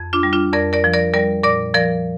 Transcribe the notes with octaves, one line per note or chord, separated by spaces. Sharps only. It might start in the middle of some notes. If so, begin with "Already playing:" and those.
Already playing: F2
D4 F4
G3
D4 F4
F2 A#4 D5
A#4 D5
F3
A#4 D5
G3 A#4 D5
A#2 A#4 D5
F3 A#4 D5